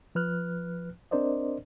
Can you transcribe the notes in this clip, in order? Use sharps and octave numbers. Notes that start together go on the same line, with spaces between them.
F3 B4 F6 F#6
C4 D4 A#4 C5 D5 D#5